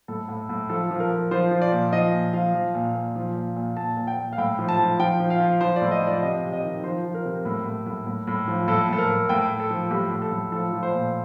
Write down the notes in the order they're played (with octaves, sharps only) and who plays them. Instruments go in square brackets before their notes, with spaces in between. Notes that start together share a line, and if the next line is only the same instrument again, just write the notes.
[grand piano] A2 A4
A2
A2
F3 A4
F3
A#4
F3
F3 C5
F3
D5
A#2
F3 D#5
A#2
F3 F5
F3
A#2
A#2
F3
A#2
A#2
A#2 A5
A#2
G5
A#2
F5
A2 G5
F3
A5
F3
F3 G5
F3
F5
F3
F3 C5
D5
A2
D#5
F3 D5
C3 D#5
C3
D#5
D#3
F3 C5
F3
A#4
C3
A2
A2
A2
A2
A2
F3
A2 A4
A2 A4
A#4
A2
A2 G5
A2
A4
F3
A2 G4
A2
A4
A2
F3 A4
F3
C5
A#2